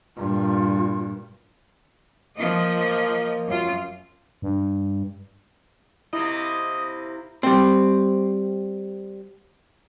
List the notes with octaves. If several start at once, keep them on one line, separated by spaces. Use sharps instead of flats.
G2 A#2 F4
F3 A#3 D#5
F#2 F4
G2
C3 A#3 E4 D#5
G3 C4